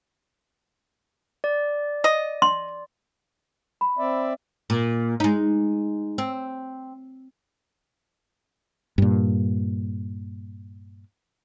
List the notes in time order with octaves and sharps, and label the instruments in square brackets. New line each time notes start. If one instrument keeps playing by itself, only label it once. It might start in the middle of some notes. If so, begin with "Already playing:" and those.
[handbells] D5
[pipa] D#5
[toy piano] C6
[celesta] B5
[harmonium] C4 D5 E5
[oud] A#2
G#3 D#4
C4
[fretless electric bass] G2 A#2